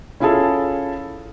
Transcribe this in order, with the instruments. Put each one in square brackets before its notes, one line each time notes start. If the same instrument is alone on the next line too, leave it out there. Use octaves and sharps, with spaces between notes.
[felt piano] C#4 E4 F4 G#4 A4